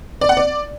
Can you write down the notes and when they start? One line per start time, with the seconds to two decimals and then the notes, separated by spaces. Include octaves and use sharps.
0.21 D5
0.29 F#5
0.37 D5